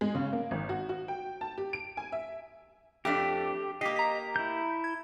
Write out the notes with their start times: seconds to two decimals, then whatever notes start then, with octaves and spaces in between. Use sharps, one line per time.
0.01 G#3
0.15 C#3
0.33 A#3
0.51 G#1
0.69 F#4
0.89 F#4
1.08 G5
1.41 A5
1.58 G4
1.73 D7
1.97 G#5
2.12 E5
3.05 F2 A3 D4 G4
3.81 A#3 G4 D#5 D6 B6 C7
3.96 A#5 B6
4.36 E4 G6
4.84 G#6